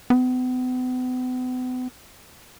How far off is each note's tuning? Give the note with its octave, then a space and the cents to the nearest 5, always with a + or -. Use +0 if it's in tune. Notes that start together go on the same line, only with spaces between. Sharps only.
B3 +40